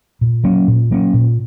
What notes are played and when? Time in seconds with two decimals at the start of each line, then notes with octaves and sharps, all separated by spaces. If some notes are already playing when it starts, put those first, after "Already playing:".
0.21 A#2
0.43 F#3 A#3 C#4
0.68 A#2
0.90 F#3 A#3 C#4
1.14 A#2